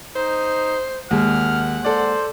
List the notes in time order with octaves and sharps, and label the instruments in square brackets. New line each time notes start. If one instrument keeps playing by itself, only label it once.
[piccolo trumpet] D#4 [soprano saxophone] C5
[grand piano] D#2 [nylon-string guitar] G#3 A#3 [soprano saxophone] F#5 [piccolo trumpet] F6
[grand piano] A4 D5 [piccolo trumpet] C5